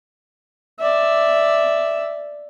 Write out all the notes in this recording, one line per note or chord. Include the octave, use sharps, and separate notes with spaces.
D5 E5